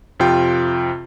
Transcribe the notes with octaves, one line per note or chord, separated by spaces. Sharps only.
F2 C3 F4 G5